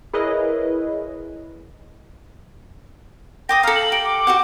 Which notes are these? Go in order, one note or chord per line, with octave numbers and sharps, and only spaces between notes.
E4 G#4 A#4 B4 C#5 D#5
G5 D6 D#6 A#6
A4 F5 A#5
F#7
G4 D7
D6
F#4 G4 F#5